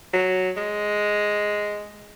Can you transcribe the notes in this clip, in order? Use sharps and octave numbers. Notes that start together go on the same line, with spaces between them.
F#3
G#3